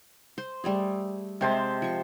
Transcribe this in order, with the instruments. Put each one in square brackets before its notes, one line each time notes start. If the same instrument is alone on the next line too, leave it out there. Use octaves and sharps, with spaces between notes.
[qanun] C5
G3 A3 G#4
[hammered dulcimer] C3 C5 A5 [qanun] G#3 C4
[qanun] F3 C#6